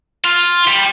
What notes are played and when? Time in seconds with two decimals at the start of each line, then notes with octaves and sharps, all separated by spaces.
0.24 F4
0.67 G3